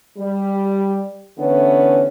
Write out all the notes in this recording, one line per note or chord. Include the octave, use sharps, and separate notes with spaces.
G3
D3 E3 A3 B3 C#4